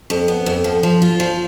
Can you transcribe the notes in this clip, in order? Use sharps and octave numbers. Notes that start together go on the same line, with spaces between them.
F2
B3
F2
F3
F3
F4
F3